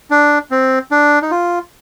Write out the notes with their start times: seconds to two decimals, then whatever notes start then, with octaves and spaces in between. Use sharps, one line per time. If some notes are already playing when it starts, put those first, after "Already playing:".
0.11 D4
0.51 C4
0.91 D4
1.22 D#4
1.31 F4